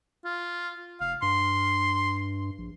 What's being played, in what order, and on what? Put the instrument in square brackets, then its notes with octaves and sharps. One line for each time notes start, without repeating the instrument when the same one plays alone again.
[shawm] F4
[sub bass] F1 [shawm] F5
[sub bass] G2 [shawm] C6
[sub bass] A#1